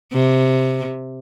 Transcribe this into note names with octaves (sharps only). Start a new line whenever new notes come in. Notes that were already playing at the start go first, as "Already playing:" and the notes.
C3